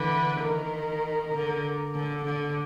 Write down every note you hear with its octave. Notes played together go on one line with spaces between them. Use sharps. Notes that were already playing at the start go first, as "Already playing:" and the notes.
Already playing: D3 E3 B4
D#3 A#4
D3
A#4
D3 A4
D3